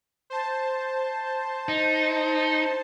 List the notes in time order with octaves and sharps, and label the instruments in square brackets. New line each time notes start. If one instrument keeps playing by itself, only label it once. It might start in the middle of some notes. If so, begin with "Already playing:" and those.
[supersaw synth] C5 A5
[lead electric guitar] D#4